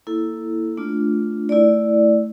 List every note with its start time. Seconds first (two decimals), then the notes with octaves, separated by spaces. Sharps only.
0.07 A#3 E4 A4
0.77 A3 D4 F4
1.49 A3 E4 D5